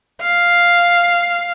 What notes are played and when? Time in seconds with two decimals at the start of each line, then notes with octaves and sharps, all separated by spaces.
0.22 F5